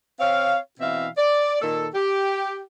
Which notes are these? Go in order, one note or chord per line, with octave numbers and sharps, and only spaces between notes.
C4 C#5 F5
B2 E3 C4 E5 F5
D5
A#2 D#3 A#3 A4
G4